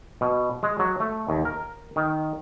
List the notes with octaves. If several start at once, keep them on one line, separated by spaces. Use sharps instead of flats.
B2
G#3
F#3
A3
D#2
A#4
D#3